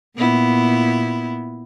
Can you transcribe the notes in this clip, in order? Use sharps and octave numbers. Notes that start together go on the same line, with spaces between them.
A#2 B3 E4